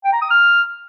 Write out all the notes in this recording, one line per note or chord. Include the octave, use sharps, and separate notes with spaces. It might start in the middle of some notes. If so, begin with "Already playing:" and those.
G5
A#5
D#6
F6